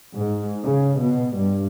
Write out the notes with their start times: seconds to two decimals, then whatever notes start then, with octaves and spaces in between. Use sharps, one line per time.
0.16 G#2
0.63 C#3
0.99 B2
1.35 G2